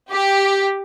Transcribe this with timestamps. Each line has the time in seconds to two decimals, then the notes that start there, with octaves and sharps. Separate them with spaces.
0.12 G4